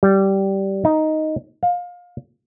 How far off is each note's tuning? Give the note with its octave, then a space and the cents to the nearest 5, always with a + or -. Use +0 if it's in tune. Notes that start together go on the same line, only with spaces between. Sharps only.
G3 -15
D#4 +5
F5 +25